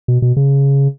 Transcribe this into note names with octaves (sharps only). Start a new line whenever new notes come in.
B2
B2
C#3